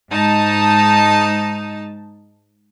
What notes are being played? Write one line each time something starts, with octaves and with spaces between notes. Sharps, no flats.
G#2 D#4 A5